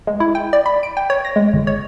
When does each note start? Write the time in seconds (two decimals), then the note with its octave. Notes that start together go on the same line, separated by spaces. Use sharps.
0.07 G#3
0.20 E4
0.35 G5
0.53 D5
0.66 B5
0.83 D7
0.97 G5
1.10 C#5
1.25 A#6
1.36 G#3
1.54 G1
1.67 C#5